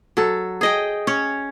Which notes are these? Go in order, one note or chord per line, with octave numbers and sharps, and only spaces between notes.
F#3 A4
G#4 D#5 G5
C#4 C#5